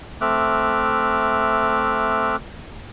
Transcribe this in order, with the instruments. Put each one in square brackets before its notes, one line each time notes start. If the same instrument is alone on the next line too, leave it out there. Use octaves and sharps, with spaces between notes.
[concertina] A3 C4 E5 D6 F6 F#6